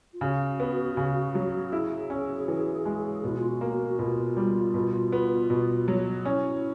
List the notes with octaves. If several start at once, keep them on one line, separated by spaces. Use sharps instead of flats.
F4
C#3 F#4
B3
C#3
F#3
E4 G#4
C#4
E3
G#3
B2 E4
F4
F#4
A#3
F#4
F#4
B2 F4
G3
B2
B3
B2
F#3
C#4 E4